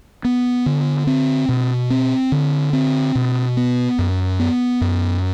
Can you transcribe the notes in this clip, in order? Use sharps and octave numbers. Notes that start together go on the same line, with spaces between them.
B3
D3
C4
B2
C4
D3
C4
B2
B3
F#2
B3
F#2